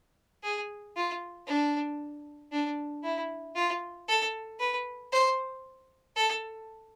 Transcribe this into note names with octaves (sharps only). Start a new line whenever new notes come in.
G#4
F4
D4
D4
E4
F4
A4
B4
C5
A4